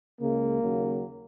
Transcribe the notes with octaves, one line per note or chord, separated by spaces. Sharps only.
C#2 C#3 G#3 A#3
D#2 C#3 F#3